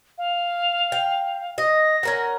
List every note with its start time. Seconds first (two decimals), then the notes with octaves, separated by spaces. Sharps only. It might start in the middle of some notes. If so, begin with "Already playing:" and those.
0.18 F5
0.92 G5
1.58 D#5 A#6
2.03 C#4 A#4 F#5